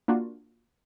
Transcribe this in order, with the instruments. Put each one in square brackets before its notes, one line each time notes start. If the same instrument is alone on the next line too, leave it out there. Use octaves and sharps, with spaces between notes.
[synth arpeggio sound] A#3 D4 F4 F#4